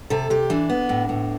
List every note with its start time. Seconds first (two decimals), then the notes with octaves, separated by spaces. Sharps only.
0.10 C3 A4
0.30 C3 G4
0.50 E3 D4
0.69 B3
0.89 A2
1.09 A2